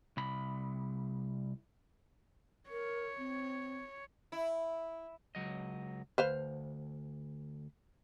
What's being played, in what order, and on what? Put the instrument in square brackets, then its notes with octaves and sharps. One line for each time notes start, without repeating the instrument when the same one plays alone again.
[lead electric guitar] C2 B5
[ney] A#4 [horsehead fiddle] C#5
[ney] C4
[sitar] E4
[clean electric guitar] C#2 F#3 D#5
[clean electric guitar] D2 [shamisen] B4 C5 F5